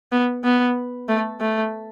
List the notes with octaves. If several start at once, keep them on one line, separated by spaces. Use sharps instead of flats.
B3
B3
A3
A3